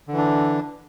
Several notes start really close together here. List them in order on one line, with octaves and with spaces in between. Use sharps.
D3 E3 D4